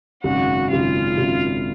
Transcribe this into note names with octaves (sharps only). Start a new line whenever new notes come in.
G#1 F#2 C#3 F#4 F#5
G#1 F#2 C#3 F4 F5
G#1 F#2 C#3